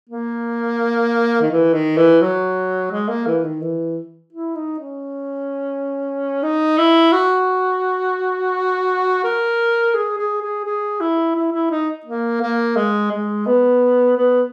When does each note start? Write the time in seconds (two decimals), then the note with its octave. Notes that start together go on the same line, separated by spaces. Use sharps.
0.09 A#3
1.41 D#3
1.51 E3
1.74 D#3
1.97 E3
2.21 F#3
2.91 G#3
3.09 A#3
3.27 E3
3.44 D#3
3.62 E3
4.33 E4
4.55 D#4
4.79 C#4
6.43 D#4
6.78 E4
7.13 F#4
9.24 A#4
9.95 G#4
10.18 G#4
10.41 G#4
10.65 G#4
11.00 E4
11.36 E4
11.52 E4
11.71 D#4
12.06 A#3
12.42 A#3
12.77 G#3
13.11 G#3
13.47 B3
14.17 B3